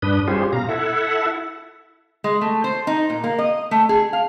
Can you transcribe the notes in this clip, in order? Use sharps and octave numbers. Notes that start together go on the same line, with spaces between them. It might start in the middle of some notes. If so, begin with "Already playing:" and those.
G2 D4 B4 D#6
G3 C#4 F4 G4 G#4 C5
B2 F5 A#5
E4 A4 E5 F#5
G#3
A3
C5
D#4
A#2
A#3
D#5
A3
G#4
F5